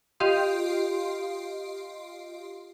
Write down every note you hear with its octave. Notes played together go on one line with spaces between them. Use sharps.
F4 G4 D#5 F5 C6